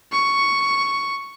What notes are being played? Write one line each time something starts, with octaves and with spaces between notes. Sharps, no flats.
C#6